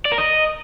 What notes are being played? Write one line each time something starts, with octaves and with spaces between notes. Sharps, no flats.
D5
A#4
D#5